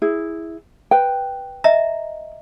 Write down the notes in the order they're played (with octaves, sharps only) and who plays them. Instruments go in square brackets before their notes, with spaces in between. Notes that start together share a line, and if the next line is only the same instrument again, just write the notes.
[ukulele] E4 G#4
B4 G5
[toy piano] D#5 E5 A#5